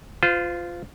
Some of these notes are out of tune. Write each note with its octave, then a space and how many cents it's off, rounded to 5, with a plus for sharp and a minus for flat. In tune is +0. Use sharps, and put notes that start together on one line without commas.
F4 +0 C5 -35